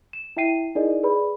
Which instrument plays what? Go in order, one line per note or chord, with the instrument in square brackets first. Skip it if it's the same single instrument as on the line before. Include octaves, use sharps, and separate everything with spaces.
[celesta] E7
E4 E5 G5 C7 D#7
D#4 E4 G#4 A#4 D5 D#5
G#4 B4 D5 B5